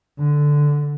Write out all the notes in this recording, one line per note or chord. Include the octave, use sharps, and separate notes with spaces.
D3